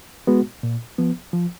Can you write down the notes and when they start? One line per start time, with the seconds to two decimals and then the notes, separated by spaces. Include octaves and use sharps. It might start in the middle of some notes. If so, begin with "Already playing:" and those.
0.27 G#3 B3 F#4
0.63 A#2
0.98 F3 B3
1.33 F3